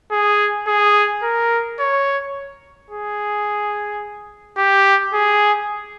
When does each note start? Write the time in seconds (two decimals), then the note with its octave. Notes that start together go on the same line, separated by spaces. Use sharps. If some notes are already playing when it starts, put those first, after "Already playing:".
0.12 G#4
0.67 G#4
1.23 A#4
1.80 C#5
2.91 G#4
4.57 G4
5.14 G#4